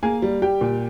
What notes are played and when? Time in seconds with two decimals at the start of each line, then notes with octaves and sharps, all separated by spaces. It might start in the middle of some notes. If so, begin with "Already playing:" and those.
0.03 A#3 G#4 G#5
0.22 G3
0.42 G3 G4 G5
0.61 A#2